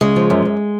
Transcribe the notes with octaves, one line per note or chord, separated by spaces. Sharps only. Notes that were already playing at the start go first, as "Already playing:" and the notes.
C#3 G#3
F3
F#2
F#2